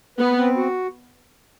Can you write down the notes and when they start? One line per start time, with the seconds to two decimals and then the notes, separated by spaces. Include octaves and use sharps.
0.18 B3 B4
0.37 C4
0.56 F#4